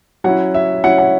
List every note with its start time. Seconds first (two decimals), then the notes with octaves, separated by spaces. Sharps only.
0.24 F#3 C#4 E4 F#5
0.54 E5
0.84 F#3 C#4 E4 F#5
0.98 F#5